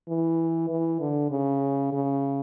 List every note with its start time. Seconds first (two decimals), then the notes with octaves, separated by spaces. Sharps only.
0.08 E3
0.69 E3
1.00 D3
1.31 C#3
1.93 C#3